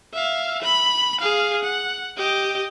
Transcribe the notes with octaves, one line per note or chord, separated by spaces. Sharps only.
E5 F5
B5
G#4 F5
F#5
G4 D#5